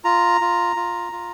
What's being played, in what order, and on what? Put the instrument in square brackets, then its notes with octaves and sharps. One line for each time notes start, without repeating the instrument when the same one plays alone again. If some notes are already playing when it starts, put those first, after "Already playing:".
[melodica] F4 A#5
F4
F4
F4